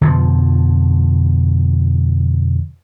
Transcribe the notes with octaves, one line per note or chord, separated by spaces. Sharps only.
F2 B2 D3 F3